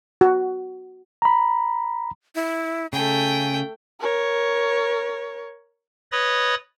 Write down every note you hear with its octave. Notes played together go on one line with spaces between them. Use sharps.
F#4
A#5 B5
E4
C#3 A3 G5 G#5
A#4 C#5
B4 C#5 D#5 B5 D#6 A6